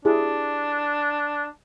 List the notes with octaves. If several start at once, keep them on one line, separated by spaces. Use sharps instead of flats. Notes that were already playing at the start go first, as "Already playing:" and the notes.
D4 E4 G4 G#4